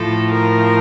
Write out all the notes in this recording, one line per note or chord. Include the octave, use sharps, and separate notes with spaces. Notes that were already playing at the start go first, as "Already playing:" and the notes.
Already playing: A2 F3 A4
A#4